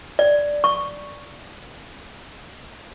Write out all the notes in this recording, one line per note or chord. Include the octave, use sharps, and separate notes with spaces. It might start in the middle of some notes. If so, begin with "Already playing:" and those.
D5
C#6